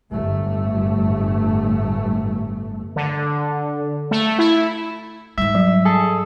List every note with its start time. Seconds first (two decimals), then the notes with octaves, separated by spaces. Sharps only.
0.11 G1 A2 A3
2.96 D3
4.11 A3
4.39 E4
5.38 G#2 G3 E5
5.55 F#3
5.85 G#4 A4